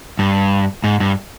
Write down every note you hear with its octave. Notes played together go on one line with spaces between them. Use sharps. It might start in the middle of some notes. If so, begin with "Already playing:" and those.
G2
G#2
G2